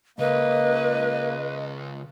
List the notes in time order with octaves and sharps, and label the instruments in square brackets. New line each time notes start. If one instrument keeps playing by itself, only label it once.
[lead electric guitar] C#2 [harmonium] A#3 [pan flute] B4 [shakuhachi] D#5